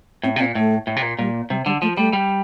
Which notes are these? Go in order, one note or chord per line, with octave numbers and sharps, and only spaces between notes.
A2 C4
C3
A#2 C4
A2 A3
A2
C3
A#2
A#2 G3
C3 G3
D3 G3
F3 A3
G3 A3
G3